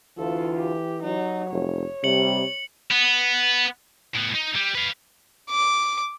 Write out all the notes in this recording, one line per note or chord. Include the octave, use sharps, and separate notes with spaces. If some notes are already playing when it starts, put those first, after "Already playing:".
D2 E3 F4 A4
G4
F#3 D#4
F1 C#5
C3 G3 C#7 F#7
B3
A2 B3
D#4
G3
B4 F5
D6